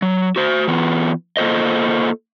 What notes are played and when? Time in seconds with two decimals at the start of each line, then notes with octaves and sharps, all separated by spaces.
0.02 F#3
0.36 F#4 C5
0.68 E3 B3 F4
1.37 A#3 F4 A4 C5 D#5